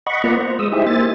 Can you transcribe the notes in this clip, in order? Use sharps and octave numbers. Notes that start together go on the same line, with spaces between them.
D#5 F#5 B5 C#6
A#3 B3 F4 D5 F#5 A#5
C5
G#3 D#6 E6
D#4 E4 G4 G#4 C5 E5
A#3 C5 E5 G#5 A6